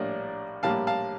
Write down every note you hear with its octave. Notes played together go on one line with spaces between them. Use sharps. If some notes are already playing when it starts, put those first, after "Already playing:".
Already playing: A#1 A2 G3 A#3 D4
A#1 A2 G3 A#3 F5 A5
F5 A5